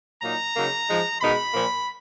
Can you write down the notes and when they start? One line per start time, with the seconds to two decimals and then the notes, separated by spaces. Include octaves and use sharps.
0.22 A#2 F#3 A#3 D#4 A#5
0.55 C#3 F#3 A#3 D#4
0.87 F3 G#3 D#4
1.20 B2 G#3 D#4 B5
1.53 A#2 F3 A#3